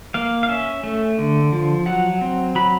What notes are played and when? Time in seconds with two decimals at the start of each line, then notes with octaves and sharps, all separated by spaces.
0.14 A#3 F5
0.43 F5
0.49 C#4 E5
0.83 A3
1.18 D3
1.52 F3
1.86 F#3 F#5
2.21 C4
2.55 F#3 B5